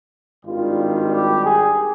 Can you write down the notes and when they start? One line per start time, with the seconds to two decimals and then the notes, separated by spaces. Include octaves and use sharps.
0.45 G#1 G2 D#3 G3 F4
1.11 G4
1.44 G#4